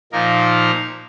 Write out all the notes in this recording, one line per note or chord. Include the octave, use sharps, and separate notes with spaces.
A#2 F3 A#3 D#4 A#4